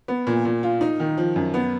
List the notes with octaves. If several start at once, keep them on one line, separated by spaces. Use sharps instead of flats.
B3
A#2
A#2
F4
D#4
D#3
F3
F#2
B3